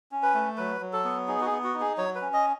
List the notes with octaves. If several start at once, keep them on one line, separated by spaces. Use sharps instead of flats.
C#4
B4
A3
F#3 B4
F#3
A4
B3
D#4 G#4
F#4
G#4
B3
F#4
D#4
G#4
F#3 C#5
B4
C#4
D#5